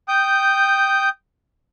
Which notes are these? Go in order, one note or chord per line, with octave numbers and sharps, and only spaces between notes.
G5 D#6 G6